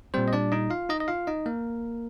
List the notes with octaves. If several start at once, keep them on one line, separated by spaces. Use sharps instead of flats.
A#2 G3 C4 C5
D#5
D4 D5
D#4 D#5
F4 F5
D#4 D#5
D#5
F4 F5
D#4 D#5
A#3 A#4